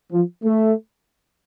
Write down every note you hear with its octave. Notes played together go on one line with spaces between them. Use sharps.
F3
A3